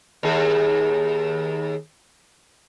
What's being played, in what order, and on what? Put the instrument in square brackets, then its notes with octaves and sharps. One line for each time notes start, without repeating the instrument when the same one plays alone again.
[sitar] D#2 G#4